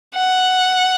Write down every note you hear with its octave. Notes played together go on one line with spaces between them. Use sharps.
F#5